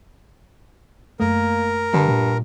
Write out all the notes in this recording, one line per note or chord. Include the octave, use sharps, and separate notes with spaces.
F#2 A3 A#3 A#4
G2 D3
A#2